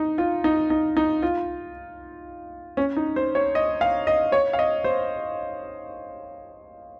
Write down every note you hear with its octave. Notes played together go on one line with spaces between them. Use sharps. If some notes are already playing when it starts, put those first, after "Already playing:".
Already playing: D#4
F4
D#4
D#4
D#4
F4
C#4
D#4
C5
C#5
D#5
F5
D#5
C#5
F5
D#5
C5